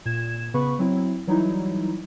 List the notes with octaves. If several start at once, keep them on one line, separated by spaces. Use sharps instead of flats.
A#2 G#6 E7
C#3 B3 B4 B5 C#6
F#3 C4 E4
E3 F#3 G3 D#4 E4